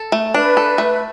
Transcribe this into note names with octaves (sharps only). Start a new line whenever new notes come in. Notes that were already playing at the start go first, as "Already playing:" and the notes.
Already playing: A4
A3
D4 B4
A4
A3